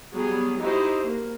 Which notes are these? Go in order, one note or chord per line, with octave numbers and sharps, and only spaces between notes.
F#3 G3 B3 G#4
D#4 E4 F#4 G4 C5
A#3